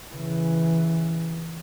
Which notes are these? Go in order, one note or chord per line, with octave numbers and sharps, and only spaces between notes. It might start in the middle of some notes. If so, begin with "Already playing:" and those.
C#3 E3